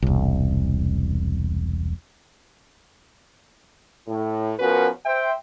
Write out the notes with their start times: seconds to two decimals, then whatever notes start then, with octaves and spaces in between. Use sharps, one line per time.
0.02 E1 C2
4.08 A2
4.59 F3 B3 C#4 F#4 A#4 B4
5.06 C5 E5 G5